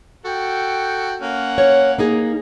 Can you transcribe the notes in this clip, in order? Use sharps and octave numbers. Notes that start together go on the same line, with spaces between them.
F#4 A4 G5
A#3 C#4 F#5
C#5
A#3 D#4 G#4